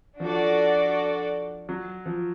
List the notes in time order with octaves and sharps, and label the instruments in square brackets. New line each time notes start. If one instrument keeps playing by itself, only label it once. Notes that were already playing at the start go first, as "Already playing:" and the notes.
[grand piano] F3 [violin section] D4 F#4 A4 D5
[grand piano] F#3
F3